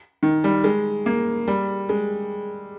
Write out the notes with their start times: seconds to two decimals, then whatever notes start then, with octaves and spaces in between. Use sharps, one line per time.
0.23 D#3
0.44 G3
0.64 G#3
1.06 A#3
1.48 G3
1.89 G#3